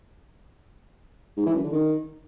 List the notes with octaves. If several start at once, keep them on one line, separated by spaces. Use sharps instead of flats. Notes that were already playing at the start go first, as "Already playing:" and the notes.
G#2
E3
F#2
D3
D#3